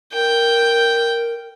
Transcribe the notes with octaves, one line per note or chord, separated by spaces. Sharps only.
A#4 G5